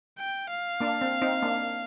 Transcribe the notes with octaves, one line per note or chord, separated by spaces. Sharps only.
G5
F5
A#3 D4
C4
C4 D#4
A#3 D4